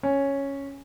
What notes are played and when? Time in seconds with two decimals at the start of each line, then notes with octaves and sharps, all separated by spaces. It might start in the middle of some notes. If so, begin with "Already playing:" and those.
0.03 C#4